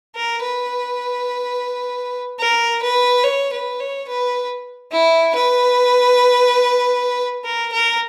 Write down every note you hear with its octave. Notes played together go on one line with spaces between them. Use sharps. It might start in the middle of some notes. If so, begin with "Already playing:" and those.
A#4
B4
A#4
B4
C#5
B4
C#5
B4
E4
B4
A#4
A#4